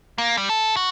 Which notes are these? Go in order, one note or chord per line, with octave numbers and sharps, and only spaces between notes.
A#3
G3
A4
F#4